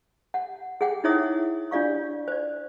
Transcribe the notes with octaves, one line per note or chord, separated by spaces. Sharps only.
F#5
G#4 F#5 G5
D#4 E4 G#4 C#5 E5 D#6
D4 F4 D5 F5 C#6
C5 D5